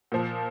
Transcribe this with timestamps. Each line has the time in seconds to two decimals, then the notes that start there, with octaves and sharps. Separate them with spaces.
0.12 A#2 F3